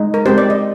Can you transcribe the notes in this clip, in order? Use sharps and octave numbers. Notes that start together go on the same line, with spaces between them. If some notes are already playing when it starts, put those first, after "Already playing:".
Already playing: G#3 D#4
A#4
G#3 C4 G4 C5
D5
D#5